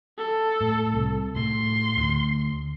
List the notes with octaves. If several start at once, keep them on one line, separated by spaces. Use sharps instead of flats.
A4
A2
C2
A2 C6
D2